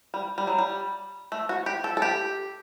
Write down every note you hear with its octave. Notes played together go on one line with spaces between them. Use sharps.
G3
G3
F#3
G3
A3
F#4
G4
A4
A4
G4